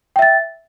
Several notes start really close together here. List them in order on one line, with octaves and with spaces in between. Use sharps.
G5 E5 A6